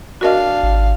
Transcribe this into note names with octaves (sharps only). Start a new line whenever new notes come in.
D4 F#4 A#4 D#5 F5
G#1